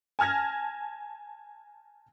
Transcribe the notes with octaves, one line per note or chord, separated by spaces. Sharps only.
G#5 A5 F6 G#6 A#6